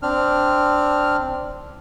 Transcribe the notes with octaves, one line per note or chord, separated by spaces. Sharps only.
C4 D4 F6